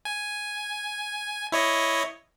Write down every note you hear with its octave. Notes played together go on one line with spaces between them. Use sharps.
G#5
E4 C#5 D#5